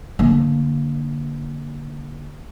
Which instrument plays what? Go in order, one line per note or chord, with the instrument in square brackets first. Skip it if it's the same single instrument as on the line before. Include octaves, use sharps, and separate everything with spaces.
[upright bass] D3 A#3